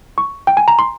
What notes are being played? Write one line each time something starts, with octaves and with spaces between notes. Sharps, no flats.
C#6
G5
G#5
A#5
C6